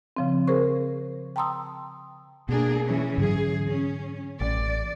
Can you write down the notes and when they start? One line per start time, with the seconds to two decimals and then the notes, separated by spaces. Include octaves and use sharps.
0.17 C#3 F3 C4
0.48 G#4 A#4 C5 C#6
1.36 G5 A5 A#5 C6 D#6 E6
2.49 B2 A#3 D4 G#4
2.83 E3 C#4
3.18 G#2 D3 F#3 G#4
3.68 C#4
4.41 A1 D5